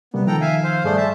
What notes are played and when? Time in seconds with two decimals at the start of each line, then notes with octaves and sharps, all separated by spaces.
0.14 C3 G3 A#3 B3
0.27 D#3 F3 A4 G5 A#5
0.41 E5 F5 G#5
0.64 C5 F5
0.84 G2 A3 G#4 C5 D5
0.97 E5 A5